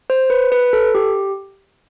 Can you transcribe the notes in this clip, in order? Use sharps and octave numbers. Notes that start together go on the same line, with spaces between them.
C5
B4
B4
A4
G4